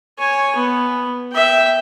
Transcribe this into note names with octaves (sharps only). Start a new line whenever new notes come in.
C#5 G#5
B3
E5 G5